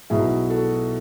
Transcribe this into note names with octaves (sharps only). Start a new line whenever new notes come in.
B1 B2 F#3 E4 G#4
F#4 A4